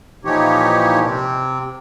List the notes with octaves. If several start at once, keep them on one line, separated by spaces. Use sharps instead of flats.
A#2 E3 F3 D#4 G4 C#5
C3 C4